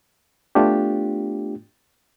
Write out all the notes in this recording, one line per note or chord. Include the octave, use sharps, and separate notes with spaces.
A3 B3 D4 F4 G4